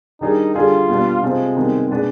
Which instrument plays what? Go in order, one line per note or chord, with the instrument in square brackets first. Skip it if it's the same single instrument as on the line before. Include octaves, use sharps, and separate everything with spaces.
[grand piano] D#3 G3 D4 G#4 [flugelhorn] D#4
[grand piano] D3 G3 D4 G#4 [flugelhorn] F4
[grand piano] B2 G3 B3 D4
[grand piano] C3 F3 C4 [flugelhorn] G#3
[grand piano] C3 D#3 G3 B3
B2 G#3 B3 D4